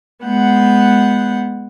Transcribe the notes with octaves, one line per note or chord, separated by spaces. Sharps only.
G#3 B3 F#5 G6